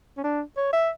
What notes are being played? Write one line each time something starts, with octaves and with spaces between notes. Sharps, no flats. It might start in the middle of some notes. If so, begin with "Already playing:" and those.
C#4
D4
C#5
E5